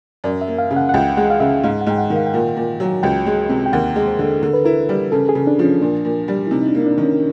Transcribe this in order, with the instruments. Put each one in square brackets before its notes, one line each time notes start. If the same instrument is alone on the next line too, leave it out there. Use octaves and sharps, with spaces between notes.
[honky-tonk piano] F#2 [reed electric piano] D5
[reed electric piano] E5
[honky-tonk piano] A#3
[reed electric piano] F5
[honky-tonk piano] C#3
[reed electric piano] F#5
F#5
[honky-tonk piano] C#2 [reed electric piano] G5
[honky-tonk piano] G#3 [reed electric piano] F#5
[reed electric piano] F5
[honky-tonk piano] C#3 [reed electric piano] E5
[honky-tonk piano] G#2 [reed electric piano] F5
[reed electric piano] F#5
[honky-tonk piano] G#2 [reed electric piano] G5
[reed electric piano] F#5
[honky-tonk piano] D#3
[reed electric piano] F5
G5
[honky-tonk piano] A#2 [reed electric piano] F#5
[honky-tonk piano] A#2
F#3
[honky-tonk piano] C#2 [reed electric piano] G5
[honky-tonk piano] G#3
C3
[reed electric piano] G5
[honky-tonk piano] D#2 [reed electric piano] F#5
[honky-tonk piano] G#3
[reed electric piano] C5
[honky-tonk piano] D3
[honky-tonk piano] D3 [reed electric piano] A#4
[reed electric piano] B4
[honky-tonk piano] E4 [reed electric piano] A#4
[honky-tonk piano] G3
[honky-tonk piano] C#3 [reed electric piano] A4
[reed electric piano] G#4
[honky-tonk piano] C#3
[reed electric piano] D4
[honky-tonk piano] F3
[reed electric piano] C#4
[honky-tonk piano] A#2 [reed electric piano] D4
[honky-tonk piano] A#2
G3
[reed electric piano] E4
[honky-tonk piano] C3 [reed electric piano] D#4
[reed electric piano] D#4
D4
[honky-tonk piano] A#3
[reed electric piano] D4
[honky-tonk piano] D#3
[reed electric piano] C#4